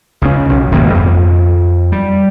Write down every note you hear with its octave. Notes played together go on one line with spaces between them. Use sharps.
C#2 C#3 C#4
B1
E1 G#2 D#3 A#3
F2
G3